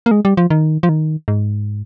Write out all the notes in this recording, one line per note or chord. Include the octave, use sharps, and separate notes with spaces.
A#3
G#3
G3
F3
D#3
F3
D#3
G#2